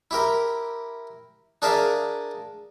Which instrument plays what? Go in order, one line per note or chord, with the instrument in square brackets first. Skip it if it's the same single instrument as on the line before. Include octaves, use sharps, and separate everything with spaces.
[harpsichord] E4 G4 A#4
D4 G#4 A#4 E5 F5